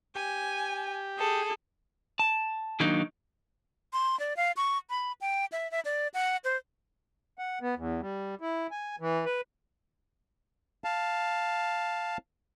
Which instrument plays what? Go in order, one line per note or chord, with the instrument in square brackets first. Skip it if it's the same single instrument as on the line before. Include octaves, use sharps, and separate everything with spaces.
[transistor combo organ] G4 [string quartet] G#5
[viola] G#4 [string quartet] A4
[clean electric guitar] A5
D#3 F#3 A#3 D4 D#4
[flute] C6
D5
F5
C#6
B5
G5
E5
E5
D5
F#5
C5
[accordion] F#5
B3
E2
G3
E4
G#5
E3
B4
[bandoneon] F5 A5